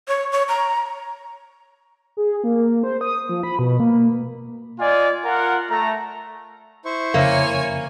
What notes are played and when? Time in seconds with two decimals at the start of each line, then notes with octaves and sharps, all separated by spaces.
0.08 C#5
0.32 C#5
0.49 A#5
2.17 G#4
2.44 A#3
2.83 C5
3.01 D#6
3.29 F3
3.43 B5
3.59 B2
3.80 A#3
4.80 F4 D5 D#5 G#5
5.25 F4 A#4 F#5
5.70 A3 A#5
6.85 E4 C5 C#6
7.14 F2 C#3 A#3 C#5 E5 G#5